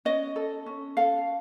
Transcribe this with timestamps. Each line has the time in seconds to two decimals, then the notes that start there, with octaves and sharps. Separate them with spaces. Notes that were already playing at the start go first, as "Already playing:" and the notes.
0.05 C#4 D#5
0.36 A4
0.66 C#4
0.97 A4 F5